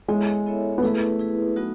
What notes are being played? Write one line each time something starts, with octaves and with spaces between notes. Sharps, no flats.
G#3 B3 E4 A4 C#5 E5
B3 E4 A4 C#5 E5
B3
A3 E4 G#4 B4
E4 G#4 B4
F#3 B3 D#4 F#4